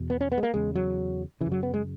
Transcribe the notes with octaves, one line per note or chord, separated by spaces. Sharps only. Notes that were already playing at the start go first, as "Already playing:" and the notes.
Already playing: E2 B2
B3
C#4
B3
G#3
A#3
E2 C#3 G#3
F#3
C#3 E3
F#2
F#3
B3
G#3